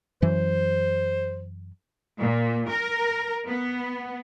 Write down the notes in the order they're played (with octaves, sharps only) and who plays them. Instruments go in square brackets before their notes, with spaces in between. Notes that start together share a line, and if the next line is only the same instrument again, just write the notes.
[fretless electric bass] F#2 E3 F#3 [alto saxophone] C5
[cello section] A#2
A#4
B3